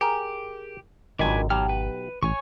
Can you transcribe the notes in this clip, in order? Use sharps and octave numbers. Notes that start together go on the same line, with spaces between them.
G4 G#4 A#4
G#1 C#2 F#2 D#3 D4 B4 G#5
B1 F#3 G4 F6
B4
A1 C#5 G#5 C#6